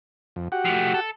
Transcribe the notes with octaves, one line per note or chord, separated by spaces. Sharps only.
F2
F#4 G4 F#5
F3 A3
A4